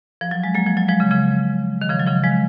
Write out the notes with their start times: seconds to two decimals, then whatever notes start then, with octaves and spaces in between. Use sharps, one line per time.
0.21 F3
0.31 F#3
0.44 G#3
0.55 F#3 A#3
0.66 F3
0.77 F#3
0.88 F3 G#3
1.00 C#3 F3
1.10 C#3 F3
1.81 D#3
1.90 C#3 F3
2.00 F#3
2.07 C#3 F3
2.23 F3 G#3